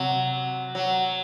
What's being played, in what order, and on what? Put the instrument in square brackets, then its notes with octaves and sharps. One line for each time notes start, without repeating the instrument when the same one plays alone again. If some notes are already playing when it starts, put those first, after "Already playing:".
Already playing: [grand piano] C3 [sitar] F#3
[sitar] F#3